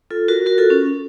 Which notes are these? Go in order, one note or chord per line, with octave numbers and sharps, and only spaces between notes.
F4 A4
F#4 A#4
F#4 A#4
F4 A4
C#4